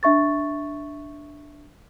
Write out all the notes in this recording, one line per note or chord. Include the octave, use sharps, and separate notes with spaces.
D4 E5 C#6 A6